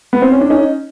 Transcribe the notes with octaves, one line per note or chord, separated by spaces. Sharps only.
B3
C4
C#4
D4
C#4 D#4